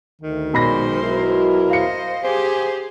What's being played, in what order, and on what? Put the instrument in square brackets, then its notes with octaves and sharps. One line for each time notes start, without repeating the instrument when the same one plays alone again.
[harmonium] D2 [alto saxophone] D#3
[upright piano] B1 B5 A#6 [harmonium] A#2 [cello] G#3 C5
[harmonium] B2 F#3 E4 [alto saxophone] A#4
[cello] C5 D#5 [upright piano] F5 C#7
[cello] G4 G#4 [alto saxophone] C5 [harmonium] G#5